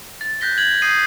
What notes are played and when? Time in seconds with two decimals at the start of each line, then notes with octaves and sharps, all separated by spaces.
0.21 A6
0.41 F#6 G6 A#6 B6 G7
0.58 G#6 F#7
0.82 D#6 G6 C7 D#7